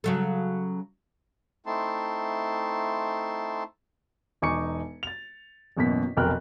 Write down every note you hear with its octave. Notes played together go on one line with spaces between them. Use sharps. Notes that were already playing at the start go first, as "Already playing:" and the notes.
C#3 F#3 A4
A3 C4 D#4 E4 A5 C6
E1 D#4 G#5 C#6 D6 C#7
A6 F7
A1 F#2 B2 A#3 B6
F1 B1 A#4 G5 F6 F#6